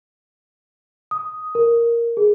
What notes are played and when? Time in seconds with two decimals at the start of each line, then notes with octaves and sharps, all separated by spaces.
1.11 D#6
1.55 A#4
2.17 G#4